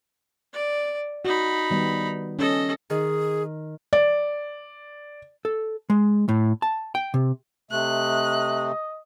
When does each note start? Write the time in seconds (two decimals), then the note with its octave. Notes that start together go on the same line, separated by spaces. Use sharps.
0.53 D5
1.25 D#4 F#4 B5
1.70 D#3 G3 B3
2.39 C#4 A4 D#5
2.90 D#3 G#4
3.93 D5
5.45 A4
5.90 G#3
6.29 A2
6.62 A5
6.95 G5
7.14 C3
7.71 C3 A3 D#5 F#6